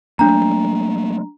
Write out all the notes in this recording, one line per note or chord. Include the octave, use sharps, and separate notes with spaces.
F#3 A3 A#3 D4 A#5